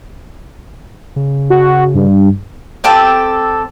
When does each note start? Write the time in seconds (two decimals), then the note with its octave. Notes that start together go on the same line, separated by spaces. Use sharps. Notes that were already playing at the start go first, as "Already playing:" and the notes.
1.16 C#3
1.50 F#4
1.94 G2
2.84 C4 G4 A4 A5